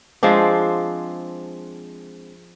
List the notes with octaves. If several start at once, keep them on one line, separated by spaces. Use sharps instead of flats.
F3 G#3 C4 D4